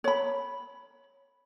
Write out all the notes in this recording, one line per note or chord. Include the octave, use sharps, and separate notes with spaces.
C#5 B5